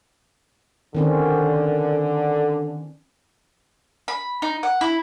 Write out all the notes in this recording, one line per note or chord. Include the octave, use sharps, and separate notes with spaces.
D3 D#3 C4 C#4
B5
D#4
F#5
E4